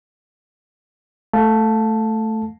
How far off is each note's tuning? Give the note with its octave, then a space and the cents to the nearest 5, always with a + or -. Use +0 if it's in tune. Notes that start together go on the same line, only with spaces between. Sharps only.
A3 +0 F5 +15 A5 +0